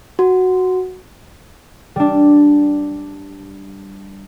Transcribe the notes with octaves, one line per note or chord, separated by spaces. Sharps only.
F#4
G3 D4